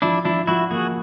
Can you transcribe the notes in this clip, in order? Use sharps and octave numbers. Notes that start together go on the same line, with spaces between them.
F3 D4 E4
F3 D4 E4
F3 E4 F#4
A#3 F#4 G#4